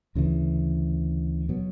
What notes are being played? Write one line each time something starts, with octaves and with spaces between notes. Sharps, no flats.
D2 C#3 E3
B2 F#3